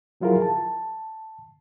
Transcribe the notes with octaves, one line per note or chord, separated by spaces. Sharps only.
F3 F#3 E4 F4 G#4 A#4
A5